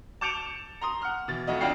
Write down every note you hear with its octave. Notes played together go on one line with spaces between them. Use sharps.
A5 D6 G6 C#7 D7 F7
A#5 C6 D#6
F#5 F6
B2 E3 A6
F2 A3 F#4 D#5
A1 F2 D4 F4 G5 C7